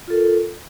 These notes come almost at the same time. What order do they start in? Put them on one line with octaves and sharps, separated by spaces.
F4 A4 A#4